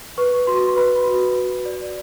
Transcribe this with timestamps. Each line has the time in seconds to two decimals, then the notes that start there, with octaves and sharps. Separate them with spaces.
0.18 B4 C#6
0.47 F#4 C6
0.76 B4 B5
1.06 F#4
1.36 F#4
1.65 D5